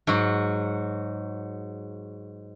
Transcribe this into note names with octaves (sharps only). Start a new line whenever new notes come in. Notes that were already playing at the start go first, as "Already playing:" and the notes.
G#2 F#3 F#4